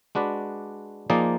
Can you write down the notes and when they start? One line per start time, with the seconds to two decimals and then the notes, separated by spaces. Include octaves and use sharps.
0.15 G#3 D4 F#4 B4 D5
1.10 F3 A#3 D#4 G#4 D5